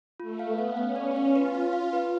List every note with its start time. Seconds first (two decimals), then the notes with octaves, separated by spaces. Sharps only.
0.20 A3 F4
0.39 F5
0.48 B3
0.58 F5
0.77 C#4 F5
0.96 D5
1.16 F5
1.35 F4 B4
1.55 F5
1.64 F4
1.73 F5
1.93 B4